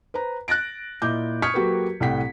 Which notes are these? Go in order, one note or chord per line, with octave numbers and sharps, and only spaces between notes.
B4 C5 A#5
F#6 A6 A#6 D7
A#2 E4 D#5 D6 G6
C#6 D#6 F6 G#6 B6 C#7
F#3 A#3 F#4 G4 A4 B4
C2 A2 F#5 G5 B6